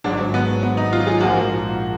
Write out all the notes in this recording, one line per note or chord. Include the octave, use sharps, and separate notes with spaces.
G#1 G#2 F#3 D4
B3
B3
D#4
F4
G#4
A#1 G#2 F3 A#3 F#4